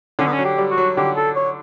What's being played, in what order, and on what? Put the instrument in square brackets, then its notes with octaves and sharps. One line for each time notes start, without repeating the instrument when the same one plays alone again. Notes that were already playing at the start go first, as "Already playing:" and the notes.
[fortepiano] D3 [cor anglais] C#4
[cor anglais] B3
C#4
[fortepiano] F#3
[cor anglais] G4
[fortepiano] G3
[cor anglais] F#4
[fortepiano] F#3
[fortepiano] D3 [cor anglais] G4
[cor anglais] A4
C#5